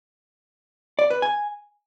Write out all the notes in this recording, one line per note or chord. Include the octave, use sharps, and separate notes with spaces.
D5
B4
G#5